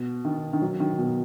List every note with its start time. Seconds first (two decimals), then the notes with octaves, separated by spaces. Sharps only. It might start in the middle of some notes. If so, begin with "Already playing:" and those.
Already playing: B2
0.25 D#3
0.53 D#3
0.62 F#3
0.80 D#3
0.98 B2